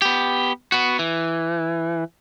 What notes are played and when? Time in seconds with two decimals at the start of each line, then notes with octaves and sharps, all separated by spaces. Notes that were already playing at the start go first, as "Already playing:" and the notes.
0.02 B3 G4
0.72 B3 F#4
0.99 E3